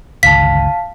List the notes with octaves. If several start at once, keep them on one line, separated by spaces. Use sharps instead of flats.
G1 C#2 D#3 F5 A5 B6